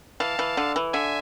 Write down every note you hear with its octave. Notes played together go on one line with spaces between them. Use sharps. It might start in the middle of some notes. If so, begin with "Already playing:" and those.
E3 F5 A5
E3
D3
E3
D3 E5 G#5